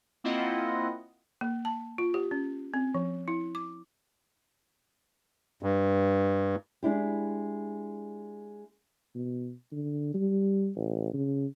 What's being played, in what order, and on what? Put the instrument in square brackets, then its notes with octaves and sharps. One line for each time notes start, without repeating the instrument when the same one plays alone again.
[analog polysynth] A#3 C4 E4 F4 D#5 F#5
[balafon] A#3
A5
F4
G4
C#4
C4
F3
E4
D6
[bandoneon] G2
[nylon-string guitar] G#3 D4 E4 G4
[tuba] B2
D3
G3
A1
C#3